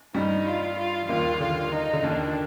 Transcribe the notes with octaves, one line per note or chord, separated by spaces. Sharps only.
G2 G3 D#4
F4
F4
F3
D#2 D#3 F4
D3 F4
D#4
D3
D#2 D#3 D4